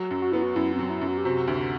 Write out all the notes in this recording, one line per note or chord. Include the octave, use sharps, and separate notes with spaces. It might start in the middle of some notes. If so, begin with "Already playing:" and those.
Already playing: F#3
F#2
F#4
B3 E4
F#4
F#2 E4
C4
F#3
E4
F#2
F#4
G4
C3 F#4
D2